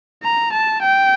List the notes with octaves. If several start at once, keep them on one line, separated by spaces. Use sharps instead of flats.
A#5
A5
G5